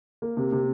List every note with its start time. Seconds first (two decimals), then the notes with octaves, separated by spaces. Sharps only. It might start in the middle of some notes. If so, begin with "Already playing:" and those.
0.22 A#3
0.37 C3
0.52 C3